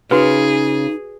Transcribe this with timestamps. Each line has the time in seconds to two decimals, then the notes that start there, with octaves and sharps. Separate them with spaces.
0.11 C#3 D#4 F#4 G#4 B4